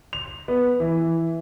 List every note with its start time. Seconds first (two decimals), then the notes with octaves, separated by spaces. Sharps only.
0.13 F7
0.48 B3
0.80 E3